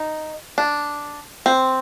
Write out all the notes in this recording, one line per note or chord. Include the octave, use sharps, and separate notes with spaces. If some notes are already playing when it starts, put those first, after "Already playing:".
Already playing: D#4
D4
C4